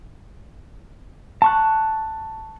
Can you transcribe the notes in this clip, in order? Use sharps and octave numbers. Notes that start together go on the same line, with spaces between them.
A5 C#6 F#6